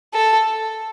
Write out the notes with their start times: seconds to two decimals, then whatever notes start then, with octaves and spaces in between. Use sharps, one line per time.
0.14 A4